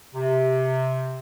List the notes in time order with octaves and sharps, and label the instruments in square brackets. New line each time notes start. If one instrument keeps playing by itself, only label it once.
[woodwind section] C3